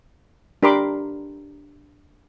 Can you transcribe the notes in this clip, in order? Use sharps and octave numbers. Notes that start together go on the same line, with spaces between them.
D4 G4 A#4 B5 C6 D6